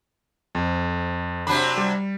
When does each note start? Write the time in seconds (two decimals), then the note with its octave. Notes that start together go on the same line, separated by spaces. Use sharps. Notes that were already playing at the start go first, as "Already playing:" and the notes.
0.55 F2
1.47 C3 F#3 D4 B5
1.77 G3